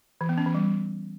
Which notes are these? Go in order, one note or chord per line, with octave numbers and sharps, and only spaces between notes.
E3
B3
C#4
E3
G3